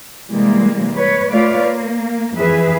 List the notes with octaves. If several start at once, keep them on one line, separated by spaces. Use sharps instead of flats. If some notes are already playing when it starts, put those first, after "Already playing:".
C3 E3 G3 G#3 A#3
B4 C#5
A3 F4 B4 C#5 D5 F5
A#3
F2 E3 G#4 B4 E5